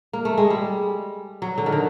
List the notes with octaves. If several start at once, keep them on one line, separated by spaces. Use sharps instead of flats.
A#3
A3
G#3
G3
F#3
D3
D#3
D3